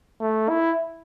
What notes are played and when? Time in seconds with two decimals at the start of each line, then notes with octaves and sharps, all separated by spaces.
0.21 A3
0.49 E4